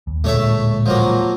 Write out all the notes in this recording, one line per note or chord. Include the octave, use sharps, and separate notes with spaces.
D#2
D1 A#2 G#3 A3 C#5 E5
F3 F#3 A#3